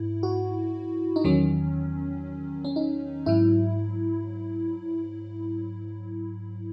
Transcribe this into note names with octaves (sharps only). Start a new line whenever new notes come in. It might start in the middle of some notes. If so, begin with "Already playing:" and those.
Already playing: G#2 E4
F#4
D#4
E2 D#3 F#3 C#4
C#4
D#4
G#2 F#3 E4